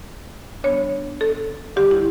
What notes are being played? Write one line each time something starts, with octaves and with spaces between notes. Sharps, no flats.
D3 G3 B3 D4 C#5
A4
D2 D3 G3 G4
E4